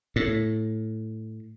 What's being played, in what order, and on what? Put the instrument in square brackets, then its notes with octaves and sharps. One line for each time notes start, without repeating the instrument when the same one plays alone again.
[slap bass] A2